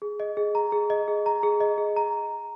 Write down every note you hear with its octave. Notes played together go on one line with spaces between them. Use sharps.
G#4
D#5
G#4
A#5
G#4
D#5
G#4
A#5
G#4
D#5
G#4
A#5